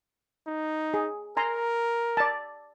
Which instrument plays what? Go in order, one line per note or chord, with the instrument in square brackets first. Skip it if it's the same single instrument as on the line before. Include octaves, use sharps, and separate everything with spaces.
[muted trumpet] D#4
[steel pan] G#4
[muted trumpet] A#4 [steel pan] G#5 A#5 C6
[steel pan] D5 A5